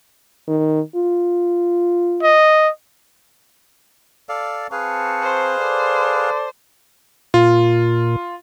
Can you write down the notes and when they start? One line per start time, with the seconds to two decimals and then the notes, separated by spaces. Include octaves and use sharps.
0.48 D#3
0.96 F4
2.23 D#5
4.29 A4 D5 F5
4.72 C4 G#4 B4 F5 A5 C#6
5.23 C5
5.58 A4 D5
7.34 A#2 F4